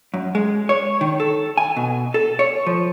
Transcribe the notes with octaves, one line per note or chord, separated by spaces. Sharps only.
F#2
G#3
C#5
D#3
A4
G#5
B2
A4
C#5
F3